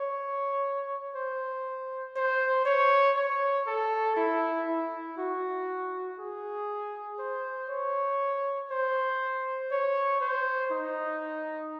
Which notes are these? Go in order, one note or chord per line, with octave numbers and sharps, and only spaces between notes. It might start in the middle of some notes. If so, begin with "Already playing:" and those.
Already playing: C#5
C5
C5
C#5
C#5
A4
E4
E4
F#4
G#4
C5
C#5
C5
C#5
C5
D#4